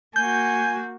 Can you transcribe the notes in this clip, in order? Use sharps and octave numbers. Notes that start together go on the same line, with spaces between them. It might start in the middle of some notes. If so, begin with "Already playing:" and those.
A#3 F#4 G#5 G6